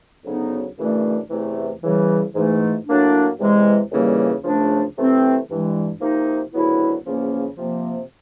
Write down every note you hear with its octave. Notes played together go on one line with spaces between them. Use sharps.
D2 C#3 F#3 B3 D#4
F#2 C#3 E3 A3 D4
E2 C3 E3 A3
C#3 E3 G3
G#2 E3 A3
A2 F#3 A#3 D4
E2 C3 E3 G#3
D#2 C#3 E3 G3 A#3
C#2 C#3 F3 A3 D4
C3 E3 A3 C4
G2 E3 G#3
C3 F3 A#3 D#4
D2 C#3 F#3 B3 E4
E2 C#3 F3 A#3 C#4
C3 F3 A#3